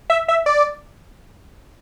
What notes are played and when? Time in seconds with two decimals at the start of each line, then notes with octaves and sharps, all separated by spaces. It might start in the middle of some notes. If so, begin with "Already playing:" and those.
0.10 E5
0.28 E5
0.46 D5